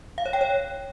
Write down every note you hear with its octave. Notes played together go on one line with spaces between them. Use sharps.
F5
C#5
G5
C#5